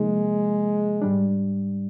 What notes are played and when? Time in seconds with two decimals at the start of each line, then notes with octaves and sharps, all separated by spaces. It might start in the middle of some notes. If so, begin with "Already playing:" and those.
Already playing: C3 F3 G#3 A#3 D#4
1.02 G#2 G3 D4